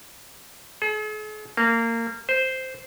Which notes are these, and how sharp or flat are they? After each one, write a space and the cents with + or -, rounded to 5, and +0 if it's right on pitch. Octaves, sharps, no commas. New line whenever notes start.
G#4 +45
A#3 -25
C5 -5